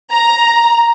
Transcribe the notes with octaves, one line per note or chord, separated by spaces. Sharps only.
A#5